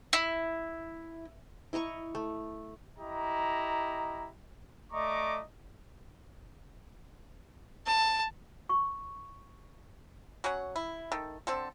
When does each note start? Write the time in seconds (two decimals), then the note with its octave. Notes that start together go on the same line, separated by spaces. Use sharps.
0.13 E4
1.73 E4 D#5 A#5 C#6
2.15 A3
2.99 E4 G4 D#5 A#5
4.93 A3 D5 D#5 A#5 C#6 D6
7.86 A5
8.69 C#6
10.44 F#3 C#4 C#5 F#5
10.76 E4
11.12 D#3 A4
11.47 D3 C4 A4